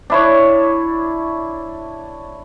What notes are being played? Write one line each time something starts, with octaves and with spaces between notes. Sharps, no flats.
D4 E4 C#5